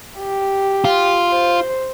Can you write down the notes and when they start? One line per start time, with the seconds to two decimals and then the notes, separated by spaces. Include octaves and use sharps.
0.19 G4
0.85 F4
1.30 C5